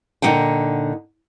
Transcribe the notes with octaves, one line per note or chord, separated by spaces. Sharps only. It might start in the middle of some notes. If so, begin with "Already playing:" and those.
A#2 D3 B3 D#4 F#5 G5